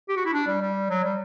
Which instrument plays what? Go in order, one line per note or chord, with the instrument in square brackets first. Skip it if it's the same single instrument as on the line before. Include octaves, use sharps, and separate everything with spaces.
[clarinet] G4
F#4
E4
D4
G3
G3
F#3
G3